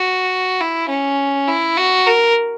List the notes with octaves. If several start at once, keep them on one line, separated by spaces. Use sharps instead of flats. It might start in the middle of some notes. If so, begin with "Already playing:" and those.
Already playing: F#4
E4
C#4
E4
F#4
A#4